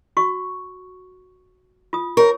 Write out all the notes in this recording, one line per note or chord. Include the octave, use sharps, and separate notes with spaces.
F#4 C#6
F4 D#6
G4 A#4 C#5